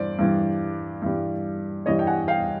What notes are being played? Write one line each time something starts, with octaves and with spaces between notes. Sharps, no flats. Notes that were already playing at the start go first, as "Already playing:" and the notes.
Already playing: G2 E3 G3 C5 D5
G2 E3 G3
G2 E3 G3
G2 E3 G3 C#5 D#5
G5
F#5 G#5
F5 G5